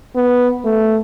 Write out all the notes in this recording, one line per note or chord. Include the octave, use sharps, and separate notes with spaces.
B3
A3